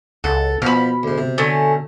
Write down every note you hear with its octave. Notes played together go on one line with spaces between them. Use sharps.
C#2 A4 F#5
B2 F3 B3 B5 F6
D2 G#2
C3
D3 A3 C#4